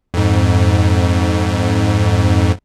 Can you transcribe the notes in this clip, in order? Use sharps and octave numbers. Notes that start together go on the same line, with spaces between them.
F2 G#2